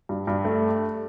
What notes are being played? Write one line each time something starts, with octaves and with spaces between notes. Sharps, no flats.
G2
G2
A3